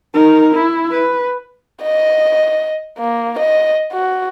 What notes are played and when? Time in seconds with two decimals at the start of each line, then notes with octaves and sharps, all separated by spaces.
0.14 D#4 A#4
0.54 E4
0.91 B4
1.83 D#5
2.99 A#3
3.39 D#5
3.93 F#4